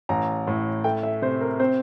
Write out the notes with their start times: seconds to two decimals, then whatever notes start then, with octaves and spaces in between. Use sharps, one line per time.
0.09 A1 A#5
0.47 A2
0.84 A3 G5
1.03 E5
1.22 C3 C5
1.41 A#4
1.59 C4 C5